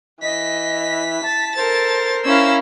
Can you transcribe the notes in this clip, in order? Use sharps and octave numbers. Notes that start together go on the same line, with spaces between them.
E3 D#5 B6
A5 A6
A4 A#4 C5 A6
C#4 E4 A#4 F5 E6